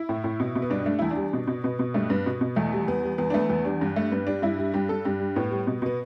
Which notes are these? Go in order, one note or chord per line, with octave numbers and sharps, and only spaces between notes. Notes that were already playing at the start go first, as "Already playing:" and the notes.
Already playing: E4
A2
A2
B2
B2
B3
G2 D4
A3 D4
E2 E4
D4
G3
B2
B2
B2 B3
B2
G2 A3
G2 B3
B2
B2
E2 A3
G3
E2 B3
G3
E2 B3
D4
A3 B3
E2 B3
G3 D4
G2
A3
G2 B3
G3 D4
G2 E4
G3
G2 G4
G2 A4
G2 G4
G3
A2 B3
G3
B2
B2 B3